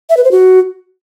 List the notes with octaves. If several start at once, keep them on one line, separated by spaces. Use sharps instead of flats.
E5
B4
C5
F#4